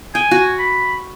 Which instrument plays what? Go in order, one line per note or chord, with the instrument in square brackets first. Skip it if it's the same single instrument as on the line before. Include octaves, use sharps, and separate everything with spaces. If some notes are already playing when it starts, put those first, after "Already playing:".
[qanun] G5 [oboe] G#5
[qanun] F#4
[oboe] B5